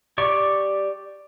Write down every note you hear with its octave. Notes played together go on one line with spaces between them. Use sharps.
G4 D5 C#6